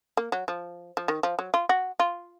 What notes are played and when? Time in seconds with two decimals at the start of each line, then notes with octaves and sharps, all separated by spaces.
0.17 A#3
0.32 F#3
0.48 F3
0.97 F3
1.08 D#3
1.23 F3
1.39 F#3
1.54 F4
1.69 F#4
2.00 F4